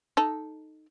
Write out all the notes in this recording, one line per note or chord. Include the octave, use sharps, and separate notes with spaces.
D#4 A4